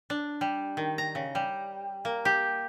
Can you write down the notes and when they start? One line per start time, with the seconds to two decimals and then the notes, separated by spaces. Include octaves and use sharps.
0.10 D4
0.41 G3
0.77 D#3
0.98 A#5
1.15 C#3
1.35 G3
2.05 A#3
2.25 G4